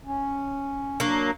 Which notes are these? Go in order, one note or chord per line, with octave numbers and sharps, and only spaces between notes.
C#4
F#3 A#3 D4